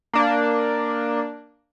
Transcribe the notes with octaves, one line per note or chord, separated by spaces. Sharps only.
A#3 D4